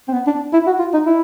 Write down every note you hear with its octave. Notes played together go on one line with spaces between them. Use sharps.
C4
B3
D4
E4
F#4
F4
D#4
E4